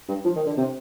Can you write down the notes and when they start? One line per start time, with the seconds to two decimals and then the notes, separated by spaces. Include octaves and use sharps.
0.08 G2
0.25 F3
0.36 D#3
0.46 D3
0.57 C3